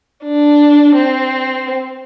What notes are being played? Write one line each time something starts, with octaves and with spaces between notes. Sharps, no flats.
D4
C4